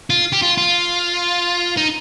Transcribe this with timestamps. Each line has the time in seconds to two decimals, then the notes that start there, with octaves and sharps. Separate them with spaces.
0.10 F4
0.33 G4
0.42 F4
0.58 F4
1.77 D#4